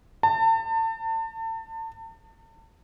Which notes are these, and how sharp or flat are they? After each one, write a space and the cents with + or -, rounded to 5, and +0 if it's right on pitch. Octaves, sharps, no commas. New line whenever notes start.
A5 +35